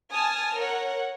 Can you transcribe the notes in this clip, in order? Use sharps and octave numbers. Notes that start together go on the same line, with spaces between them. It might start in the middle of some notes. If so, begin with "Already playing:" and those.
G#5 A5 D#6 F6
A#4 C#5 F#5